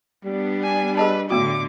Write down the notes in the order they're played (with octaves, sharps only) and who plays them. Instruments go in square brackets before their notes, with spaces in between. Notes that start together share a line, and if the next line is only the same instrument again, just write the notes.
[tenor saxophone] G3 [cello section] B3 D4
[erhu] G#5
[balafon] G#4 D#5 A5 [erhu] B4
[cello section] A2 D3 [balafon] A3 B3 F#4 [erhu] D6